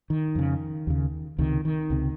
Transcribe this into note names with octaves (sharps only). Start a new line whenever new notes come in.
D#3
F2 C#3
D#2 C#3
C#2 C3 D#3
D#3
C#2 C3